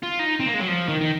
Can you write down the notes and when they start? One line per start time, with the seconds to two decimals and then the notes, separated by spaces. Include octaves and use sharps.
0.03 F4
0.19 D#4
0.40 C4
0.46 A#3
0.54 G#3
0.60 F#3
0.68 F3
0.88 D#3
1.01 D#3